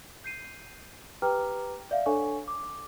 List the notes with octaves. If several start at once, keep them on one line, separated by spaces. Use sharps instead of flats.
G6 C7 D#7
G4 B4 G5 A#5 D6 F6
D5 E5 F5
D4 A4 C#5 F#5 G#5 C#6
D6